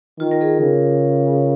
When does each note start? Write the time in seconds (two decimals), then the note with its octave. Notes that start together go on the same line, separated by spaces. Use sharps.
0.20 D#3 F4
0.31 A#4
0.41 G#4
0.61 C#3